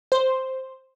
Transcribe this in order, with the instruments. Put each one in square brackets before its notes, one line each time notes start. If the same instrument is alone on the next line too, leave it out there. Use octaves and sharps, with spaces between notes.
[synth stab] C5